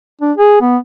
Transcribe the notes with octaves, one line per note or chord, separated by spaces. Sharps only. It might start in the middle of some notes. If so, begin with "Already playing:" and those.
D4
G#4
B3